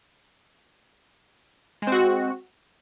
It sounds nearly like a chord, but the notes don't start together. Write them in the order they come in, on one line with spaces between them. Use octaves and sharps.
G#3 C4 F#4